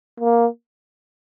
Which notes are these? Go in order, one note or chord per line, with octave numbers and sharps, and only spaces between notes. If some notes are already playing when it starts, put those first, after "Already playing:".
A#3